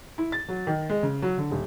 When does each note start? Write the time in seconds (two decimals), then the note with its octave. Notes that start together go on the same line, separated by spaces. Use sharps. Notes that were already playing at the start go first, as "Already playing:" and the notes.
0.18 E4
0.32 A6
0.48 F#3
0.67 D#3
0.90 G#3
1.03 C#3
1.22 F#3
1.38 D3
1.51 D#1